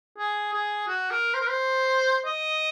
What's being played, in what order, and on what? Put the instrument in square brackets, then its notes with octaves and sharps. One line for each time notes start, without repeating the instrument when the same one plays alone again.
[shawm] G#4
G#4
F#4
A#4
C5
A#4
C5
D#5